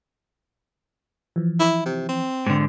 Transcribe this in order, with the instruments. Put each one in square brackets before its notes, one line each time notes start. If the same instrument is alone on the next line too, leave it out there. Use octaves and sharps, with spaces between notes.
[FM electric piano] E3 F3
[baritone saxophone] E4
C3
C4
[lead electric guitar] G#2 D3